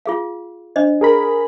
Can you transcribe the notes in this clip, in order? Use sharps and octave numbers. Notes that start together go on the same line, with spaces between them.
F4 G#4 F5
D4 C5 D#5
G#4 A#4 B5